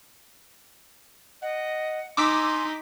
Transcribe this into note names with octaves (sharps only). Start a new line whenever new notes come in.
D#5 F#5
D#4 G#5 C6 D6 E6 B6